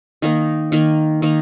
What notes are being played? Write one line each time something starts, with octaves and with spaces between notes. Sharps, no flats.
D#3 A#3 D#4
D#3 A#3 D#4
D#3 A#3 D#4